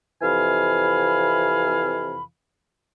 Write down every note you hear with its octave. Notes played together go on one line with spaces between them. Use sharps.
F2 C3 E3 F5 G#5 B5